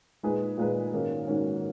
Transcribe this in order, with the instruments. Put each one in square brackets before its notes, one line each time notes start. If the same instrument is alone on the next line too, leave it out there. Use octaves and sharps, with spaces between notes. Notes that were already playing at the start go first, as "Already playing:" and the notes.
[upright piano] A#2 G#3 D#4 G#4 B4
A#2 G#3 D#4 G#4 B4
G#2 D#3 A#3 C#4 F#4
G#2 D#3 A#3 C#4 F#4